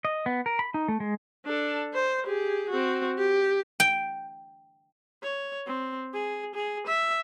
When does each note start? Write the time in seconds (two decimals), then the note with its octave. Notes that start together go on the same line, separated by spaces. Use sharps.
0.05 D#5
0.26 B3
0.46 A#4
0.59 B5
0.74 D#4
0.88 A3
1.00 G#3
1.46 D4 A4
1.94 C5
2.25 G4 G#4
2.70 C4 F#4
3.18 G4
3.80 G5
5.23 C#5
5.67 C4
6.13 G#4
6.55 G#4
6.87 E5